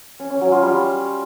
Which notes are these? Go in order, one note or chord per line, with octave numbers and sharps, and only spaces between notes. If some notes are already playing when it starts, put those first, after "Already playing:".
C#4
C#4
F#3
F4
G3